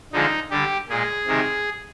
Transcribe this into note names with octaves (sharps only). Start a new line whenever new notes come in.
D3 F3 G#3 D#4
D3 G3 G4
A#2 G#3 G#4
C3 D#3 G#3